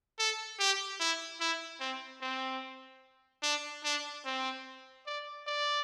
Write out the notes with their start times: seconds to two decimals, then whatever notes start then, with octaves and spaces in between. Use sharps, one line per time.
0.19 A4
0.59 G4
1.00 E4
1.40 E4
1.80 C4
2.21 C4
3.43 D4
3.84 D4
4.25 C4
5.07 D5
5.47 D5